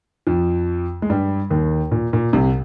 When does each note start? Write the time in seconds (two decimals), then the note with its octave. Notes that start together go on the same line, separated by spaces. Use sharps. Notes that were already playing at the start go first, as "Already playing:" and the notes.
0.27 F2 F3
1.02 G#3
1.10 G2 G3
1.50 D#2 D#3
1.92 A#2
2.13 A#2
2.33 C2 C3